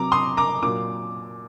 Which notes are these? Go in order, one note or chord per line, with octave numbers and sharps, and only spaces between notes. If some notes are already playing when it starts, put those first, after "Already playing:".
Already playing: C3 F#3 A#5 D6
C6 D#6
A#5 D6
A#2 F#3 D6